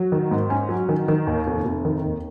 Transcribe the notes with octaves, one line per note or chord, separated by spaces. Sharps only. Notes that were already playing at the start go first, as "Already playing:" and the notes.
Already playing: F#3
D#3
G#2
C#4
F#3
D#3
D#3
D#2
F1
F1
D#3
D#2